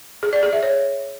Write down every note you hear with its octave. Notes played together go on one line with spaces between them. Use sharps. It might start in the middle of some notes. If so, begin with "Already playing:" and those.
G#4
D5
G#4
E5
C#5